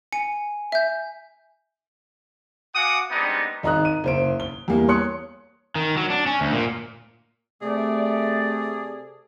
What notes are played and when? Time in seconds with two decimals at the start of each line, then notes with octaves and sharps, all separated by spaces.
0.13 G#5 C#7
0.72 E5 G6
2.75 F#4 F5 F#5 G#5 D6 D#6
3.11 G3 G#3 B3 C4 D4 D#4
3.63 G#1 D#4 A#5 D#6 F#6
3.85 D#7
4.04 F#1 C5 D7
4.40 G7
4.68 E2 G3 A#3
4.88 C#5 C6 D#6 F#6 C#7
5.75 D#3
5.97 F#3
6.10 D4
6.26 C#4
6.41 D2
6.52 A#2
7.62 C3 A3 G#4 A4 D5